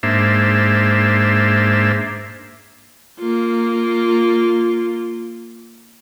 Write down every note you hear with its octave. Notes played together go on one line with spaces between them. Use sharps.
G#2 A#3 D4 C5 E5
A#3 F4